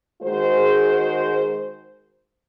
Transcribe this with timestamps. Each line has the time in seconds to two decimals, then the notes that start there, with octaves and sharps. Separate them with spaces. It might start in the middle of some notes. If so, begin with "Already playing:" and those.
0.22 D#3 G#3 F#4 G#4 C5